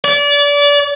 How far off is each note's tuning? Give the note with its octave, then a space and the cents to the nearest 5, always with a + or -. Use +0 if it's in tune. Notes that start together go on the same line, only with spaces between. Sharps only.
D5 -30